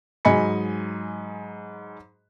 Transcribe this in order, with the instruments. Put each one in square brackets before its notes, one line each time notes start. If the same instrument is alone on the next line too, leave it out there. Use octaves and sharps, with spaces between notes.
[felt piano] G#2 F#3 D#5 G#5 B5 C#7